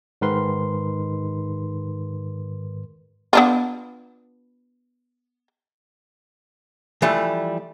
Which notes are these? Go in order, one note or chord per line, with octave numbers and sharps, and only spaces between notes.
G#2 D#3 A#4 B4 C6
B3 D4 F4
E3 F3 G3 A3